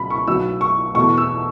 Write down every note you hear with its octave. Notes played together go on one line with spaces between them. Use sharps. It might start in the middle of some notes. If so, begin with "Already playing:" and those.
Already playing: C#2 B2 F#3 B5
C#6
B1 B2 F#3 E6
C#6
E2 B2 A3 C#6
E6